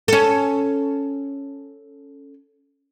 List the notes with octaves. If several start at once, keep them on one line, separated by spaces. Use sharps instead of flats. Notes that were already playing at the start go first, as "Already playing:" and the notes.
C#4 A4